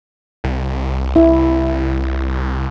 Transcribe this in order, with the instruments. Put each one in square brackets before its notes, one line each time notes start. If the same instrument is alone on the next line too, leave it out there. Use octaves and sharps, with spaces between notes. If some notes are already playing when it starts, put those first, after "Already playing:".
[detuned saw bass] C2
[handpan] E4